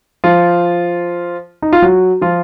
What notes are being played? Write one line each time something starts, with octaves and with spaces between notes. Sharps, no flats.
F3 F4
D#4
F4
F#3 F#4
F3 F4